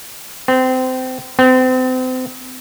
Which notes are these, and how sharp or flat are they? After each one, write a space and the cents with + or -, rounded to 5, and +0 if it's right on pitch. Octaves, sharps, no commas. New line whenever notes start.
C4 -25
C4 -35